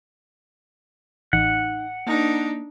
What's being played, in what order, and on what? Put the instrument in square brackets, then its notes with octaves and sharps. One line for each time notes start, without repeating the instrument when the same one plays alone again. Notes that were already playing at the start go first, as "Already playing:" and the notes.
[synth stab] A1 [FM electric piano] D#4 [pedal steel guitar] F#5
[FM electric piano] A#3 [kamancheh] D4 D#4